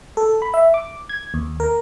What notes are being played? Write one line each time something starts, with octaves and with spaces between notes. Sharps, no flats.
A4
B5
E5
D6
G#6
D#2
A#4